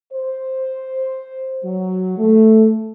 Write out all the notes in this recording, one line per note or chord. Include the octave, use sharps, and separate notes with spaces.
C5
F#3
A3